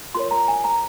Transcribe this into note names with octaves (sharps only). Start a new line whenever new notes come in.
F4 A#4 C#5 C6
A#5
G#5
A#5